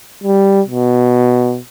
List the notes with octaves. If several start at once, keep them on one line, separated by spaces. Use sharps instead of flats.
G3
B2